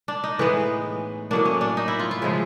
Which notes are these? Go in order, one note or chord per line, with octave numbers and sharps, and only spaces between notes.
D4
D#4
A2 E3 G#3 B3
A2 F#3 A#3 D4
C#4
D4
D#4
E4
F4
F4
C#3 F3 G#3 E4